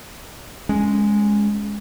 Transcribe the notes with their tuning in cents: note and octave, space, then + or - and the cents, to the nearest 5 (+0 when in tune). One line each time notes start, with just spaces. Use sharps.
G#3 -5 C#4 +0